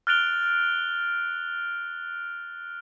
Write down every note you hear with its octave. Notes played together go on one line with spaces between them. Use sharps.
F6 F#6 A6 D7 F7 G7